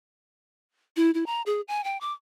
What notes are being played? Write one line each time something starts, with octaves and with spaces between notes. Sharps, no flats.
E4
E4
A#5
G#4
G#5
G5
D6